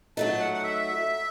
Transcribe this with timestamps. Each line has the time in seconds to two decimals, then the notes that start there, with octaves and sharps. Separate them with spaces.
0.17 F#3 A3 D#4 A5
0.40 F#5
0.54 F#5
0.63 E5